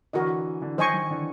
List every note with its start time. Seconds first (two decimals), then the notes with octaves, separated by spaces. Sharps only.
0.13 D3 E3 F#4 A#4 D#5
0.62 D3 E3
0.78 D#3 C5 D#5 G#5 C#6
0.94 D#3
1.10 D3 E3